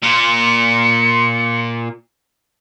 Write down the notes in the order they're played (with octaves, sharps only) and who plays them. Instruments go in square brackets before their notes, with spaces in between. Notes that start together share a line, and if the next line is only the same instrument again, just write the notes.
[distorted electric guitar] A#2 F4 [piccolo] C#7